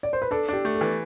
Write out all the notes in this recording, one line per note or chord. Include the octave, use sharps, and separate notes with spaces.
D5
C5
B4
D4 A4
D4 G4
A3
A4
E3